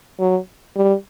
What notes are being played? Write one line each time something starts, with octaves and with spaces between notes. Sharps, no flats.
F#3
G3